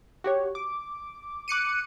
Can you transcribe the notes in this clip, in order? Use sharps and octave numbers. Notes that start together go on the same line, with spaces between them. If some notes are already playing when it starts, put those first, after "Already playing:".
F#4 G4 C#5
D6
D6 F#6 C#7 D#7